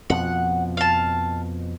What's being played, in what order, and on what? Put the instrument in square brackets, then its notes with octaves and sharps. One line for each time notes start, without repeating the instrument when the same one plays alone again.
[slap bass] F2 B2 F3 [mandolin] F#5
[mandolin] F5 A5